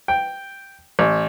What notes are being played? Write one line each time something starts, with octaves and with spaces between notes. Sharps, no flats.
G5
A1